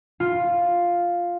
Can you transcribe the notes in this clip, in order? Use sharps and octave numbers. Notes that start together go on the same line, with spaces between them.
F4